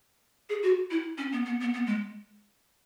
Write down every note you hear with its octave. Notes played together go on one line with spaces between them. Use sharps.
G#4
F#4
E4
C#4
B3
B3
B3
B3
G#3